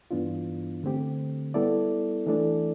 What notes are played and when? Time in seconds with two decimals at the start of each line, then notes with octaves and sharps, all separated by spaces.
0.11 G2 E3 B3 D4 F4
0.83 D3 A3 C4 G4
1.54 G3 B3 E4 A4 D5
2.27 E3 A3 D4 A4 D5